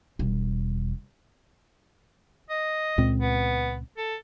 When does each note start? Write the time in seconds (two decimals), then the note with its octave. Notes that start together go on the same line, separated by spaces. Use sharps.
0.19 E1 G3
2.50 D#5
2.98 C#2 A#2 C4
3.20 B3
3.98 A4